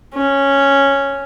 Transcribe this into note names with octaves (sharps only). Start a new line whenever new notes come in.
C#4